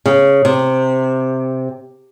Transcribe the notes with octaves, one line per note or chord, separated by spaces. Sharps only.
C#3
C3